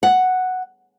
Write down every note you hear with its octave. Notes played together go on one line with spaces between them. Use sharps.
F#5